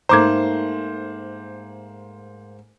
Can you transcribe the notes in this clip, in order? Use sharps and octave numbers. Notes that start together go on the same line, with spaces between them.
G#2 A3 A#3 C5 A#5 D6 G#6